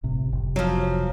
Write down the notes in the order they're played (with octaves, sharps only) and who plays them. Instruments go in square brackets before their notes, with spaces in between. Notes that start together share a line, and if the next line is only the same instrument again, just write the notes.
[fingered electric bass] G1 A2 C3
F1 C2 C3
[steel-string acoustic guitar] F3 F#3